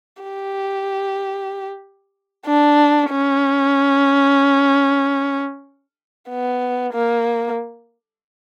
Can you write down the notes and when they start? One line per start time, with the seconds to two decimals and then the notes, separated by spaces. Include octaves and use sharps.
0.23 G4
2.46 D4
3.10 C#4
6.29 B3
6.93 A#3